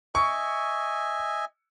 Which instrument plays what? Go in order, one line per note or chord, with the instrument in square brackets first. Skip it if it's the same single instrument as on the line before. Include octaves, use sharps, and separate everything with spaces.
[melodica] D#5 E5 G#5 [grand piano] C#6